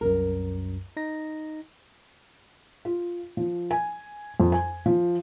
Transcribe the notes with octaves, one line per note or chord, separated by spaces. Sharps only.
C2 F#2 A#4
D#4 A#6
F4
F3
G#5
F2
G#5
F3